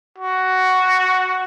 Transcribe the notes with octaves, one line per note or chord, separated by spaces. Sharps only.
F#4